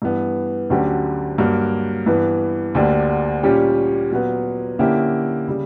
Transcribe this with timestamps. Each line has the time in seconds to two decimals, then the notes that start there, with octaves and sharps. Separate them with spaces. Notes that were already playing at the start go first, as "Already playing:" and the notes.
0.02 G2 E3 B3
0.70 D2 D3 F#3 C#4 G4
1.38 G2 F#3 A#3
2.06 G2 E3 B3
2.75 D2 D3 A#3 D4 G4
3.43 A#2 G3 C#4 G4
4.11 A#2 F#3 B3
4.79 D3 A#3 C#4 E4 G4
5.48 C#3 G3